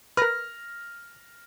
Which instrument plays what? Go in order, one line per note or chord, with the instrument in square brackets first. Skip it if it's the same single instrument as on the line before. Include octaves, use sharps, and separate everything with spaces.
[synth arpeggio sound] A#4 B4 [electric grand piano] F6 A#6